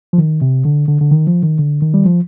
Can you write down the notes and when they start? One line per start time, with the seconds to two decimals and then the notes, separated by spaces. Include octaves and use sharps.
0.13 F3
0.18 D#3
0.42 C3
0.65 D3
0.88 D3
1.01 D3
1.12 D#3
1.27 F3
1.43 D#3
1.59 D3
1.82 D#3
1.94 G3
2.05 F3